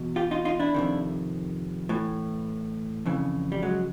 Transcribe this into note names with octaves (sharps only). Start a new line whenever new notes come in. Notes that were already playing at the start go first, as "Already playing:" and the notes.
Already playing: E2 B2
F4 G4
D#4 F4
D#4 F4
D4 E4
F2 C3 D#3
A2 E3
F2 C#3 E3
G3
F#3 G#3